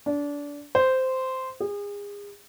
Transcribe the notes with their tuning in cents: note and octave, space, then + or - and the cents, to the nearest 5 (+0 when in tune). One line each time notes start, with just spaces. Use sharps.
D4 -25
C5 -10
G#4 -35